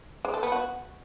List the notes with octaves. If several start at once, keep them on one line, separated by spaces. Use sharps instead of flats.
G#3
A4
B3
F#4